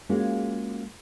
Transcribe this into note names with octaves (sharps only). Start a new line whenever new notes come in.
G#3 A#3 C#4 F4 F#4